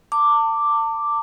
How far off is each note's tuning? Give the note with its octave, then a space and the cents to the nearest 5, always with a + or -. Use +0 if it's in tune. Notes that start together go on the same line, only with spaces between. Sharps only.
A5 +35 D6 +0